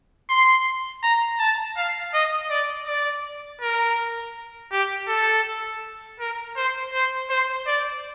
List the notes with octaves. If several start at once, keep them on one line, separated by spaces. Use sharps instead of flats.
C6
A#5
A5
F5
D#5
D5
D5
A#4
G4
A4
A#4
C5
C5
C5
D5